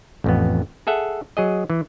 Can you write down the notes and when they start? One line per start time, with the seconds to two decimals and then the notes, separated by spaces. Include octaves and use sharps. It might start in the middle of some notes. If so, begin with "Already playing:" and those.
0.24 A1 F2 B3
0.87 G#4 A4 E5 F#5
1.37 F#3 G#4 D#5
1.70 E3